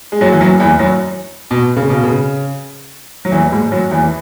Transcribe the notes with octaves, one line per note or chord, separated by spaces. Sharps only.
G#3
F#2 F#3
E3
F#2 F#3
E2 E3
F#2 F#3
B2
C#3
B2
C#3
F#3
E2 E3
G#2 G#3
F#2 F#3
E2 E3
E3